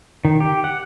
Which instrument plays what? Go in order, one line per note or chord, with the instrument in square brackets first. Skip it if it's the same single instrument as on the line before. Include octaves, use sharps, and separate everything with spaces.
[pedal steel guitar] D#3
G4
F#5